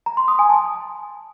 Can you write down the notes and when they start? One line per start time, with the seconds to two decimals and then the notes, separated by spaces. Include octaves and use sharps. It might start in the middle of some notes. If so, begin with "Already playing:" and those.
0.06 A#5
0.17 C6
0.28 D#6
0.39 G#5
0.50 A5